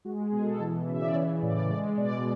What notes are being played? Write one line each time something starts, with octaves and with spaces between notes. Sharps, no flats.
G#3 F#4
G#4
B2
A4
E3
C#3 E5
D5
E3 C#5
A2 D5
G#3 D5
B2 D5